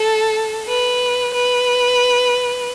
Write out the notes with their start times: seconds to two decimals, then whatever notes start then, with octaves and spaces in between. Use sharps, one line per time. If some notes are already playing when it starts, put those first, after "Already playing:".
Already playing: A4
0.68 B4
1.34 B4